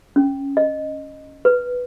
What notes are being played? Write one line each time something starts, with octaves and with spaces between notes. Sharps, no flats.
C#4
D#5
B4